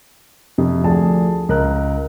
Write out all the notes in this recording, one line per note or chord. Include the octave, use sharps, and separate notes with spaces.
F2 C3
D2 F3 D4 G#4 A5
C#2 A#4 F#6